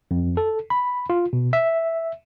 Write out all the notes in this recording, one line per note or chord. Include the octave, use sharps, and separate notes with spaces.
F2
A4
B5
F4
B2
E5